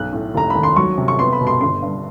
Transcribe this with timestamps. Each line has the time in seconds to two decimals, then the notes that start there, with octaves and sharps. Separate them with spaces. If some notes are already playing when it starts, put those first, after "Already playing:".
Already playing: B1 F#6
0.12 A2
0.35 F1 A#5
0.50 D#2 B5
0.63 C6
0.76 F#3 C#6
0.98 C3
1.08 C#6
1.19 B3 C6
1.33 B5
1.41 B2
1.47 C6
1.61 G1 C6
1.82 G2